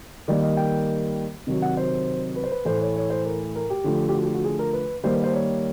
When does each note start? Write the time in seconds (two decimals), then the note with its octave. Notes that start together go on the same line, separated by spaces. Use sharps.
0.28 D#3 G3 A#3 D5
0.43 D#5
0.57 G5
1.47 C3 D#3 F#3
1.62 F#5
1.77 C5
2.36 B4
2.44 C5
2.52 B4
2.65 A2 E3 A3 C5
2.81 C#5
2.96 C#5
3.10 C5
3.25 A#4
3.56 A#4
3.70 G4
3.84 D3 F3 A3
4.09 G4
4.14 F#4
4.25 G4
4.34 F#4
4.45 G#4
4.59 A#4
4.73 B4
5.04 D#3 G3 A#3 C5
5.14 B4
5.24 C5
5.33 C#5